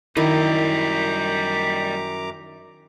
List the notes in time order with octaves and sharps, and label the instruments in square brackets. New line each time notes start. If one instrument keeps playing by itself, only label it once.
[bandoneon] F#2 A#5 D6 [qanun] D#3 E4 [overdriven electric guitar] G3 D#5